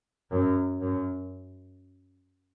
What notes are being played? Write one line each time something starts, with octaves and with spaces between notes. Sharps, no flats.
F#2
F#2